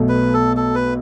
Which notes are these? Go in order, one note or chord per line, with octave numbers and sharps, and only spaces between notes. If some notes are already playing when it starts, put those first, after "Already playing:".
Already playing: B1 B2 A3
B4
A4
A4
B4